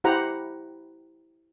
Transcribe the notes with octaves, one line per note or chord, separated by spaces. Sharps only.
E4 G4 C5 F#5 A#5 B5